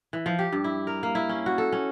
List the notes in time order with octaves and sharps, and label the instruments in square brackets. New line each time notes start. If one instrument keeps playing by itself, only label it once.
[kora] E3
F3
G4
G2
E4
A#4
A#3
E4
C#4
F#4
A4
C#4